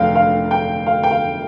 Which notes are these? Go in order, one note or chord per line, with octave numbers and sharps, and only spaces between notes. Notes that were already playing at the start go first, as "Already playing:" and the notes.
Already playing: F1 D3 F5 G5
F5
G5
F5
G5
F5